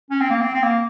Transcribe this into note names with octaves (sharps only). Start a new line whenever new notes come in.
C#4
C4
A#3
C4
C4
A#3